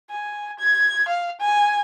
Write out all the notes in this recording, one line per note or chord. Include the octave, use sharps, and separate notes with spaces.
G#5
G#6
F5
G#5